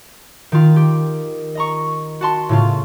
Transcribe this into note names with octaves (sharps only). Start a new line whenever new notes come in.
D#3 F4
G4
D#5 A#5 C#6
F#4 A5 C6
A2 C#3 F4